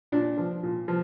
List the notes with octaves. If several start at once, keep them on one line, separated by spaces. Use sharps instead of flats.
A#2 D4
F3
A#2
F3